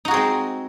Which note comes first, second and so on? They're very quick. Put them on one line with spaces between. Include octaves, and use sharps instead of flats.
D#4 F#4 G#4 C4 G#3